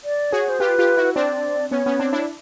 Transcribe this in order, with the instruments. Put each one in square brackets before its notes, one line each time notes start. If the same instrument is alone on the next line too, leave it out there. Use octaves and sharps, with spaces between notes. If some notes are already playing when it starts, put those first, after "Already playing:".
[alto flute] D5
[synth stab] F#4 G#4 [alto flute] C#5
[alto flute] C5
[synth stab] F4 G4 [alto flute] B4
[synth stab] F4 G4
E4 F#4
[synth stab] C4 D4 [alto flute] D5
[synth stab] B3 C#4 [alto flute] C#5
[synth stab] B3 C#4
C4 D4
D4 E4